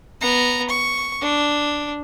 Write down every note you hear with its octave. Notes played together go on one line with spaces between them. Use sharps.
B3 A#5
C#6
D4